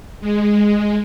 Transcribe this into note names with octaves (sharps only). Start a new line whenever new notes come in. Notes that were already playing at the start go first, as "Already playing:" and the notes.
G#3